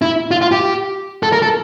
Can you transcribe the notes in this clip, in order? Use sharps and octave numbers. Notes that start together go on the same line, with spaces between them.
E4
F4
F4
G4
A4
A#4
A4